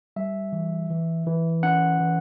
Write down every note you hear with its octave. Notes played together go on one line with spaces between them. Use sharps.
G3 E5
E3
E3
E3
C#4 F#5
E3